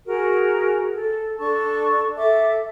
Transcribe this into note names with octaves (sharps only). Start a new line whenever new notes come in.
F#4 G#4 A#4
A4
D4 A4 A5 C#6
A4 E5 D6